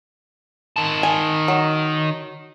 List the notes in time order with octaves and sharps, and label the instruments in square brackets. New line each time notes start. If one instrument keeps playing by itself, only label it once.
[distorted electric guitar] D#3 A5
[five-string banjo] G#5
F#3